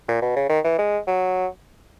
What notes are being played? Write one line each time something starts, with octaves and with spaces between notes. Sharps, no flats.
A#2
B2
C#3
D#3
E3
G#3
F#3